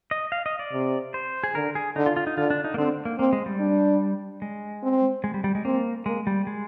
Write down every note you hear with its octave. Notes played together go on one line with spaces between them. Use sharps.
D#5
F5
D#5
D5
C3
C5
G#4
D3 A#4
G#4
D3 D#4
F4
F4
D#4
D3 F4
D4
D#4
A#3
D3 C4
A#3
A#3 C4
G#3
G3
D4
G#3
C4
G#3
G3
G3
G#3
A#3 C4
G#3 A#3
G3
G#3